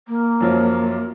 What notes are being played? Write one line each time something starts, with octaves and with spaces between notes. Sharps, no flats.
A#3
F#2 F3 F#3